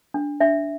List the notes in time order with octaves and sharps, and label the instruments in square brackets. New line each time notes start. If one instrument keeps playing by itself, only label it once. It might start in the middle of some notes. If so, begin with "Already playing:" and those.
[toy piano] D4
D4 E5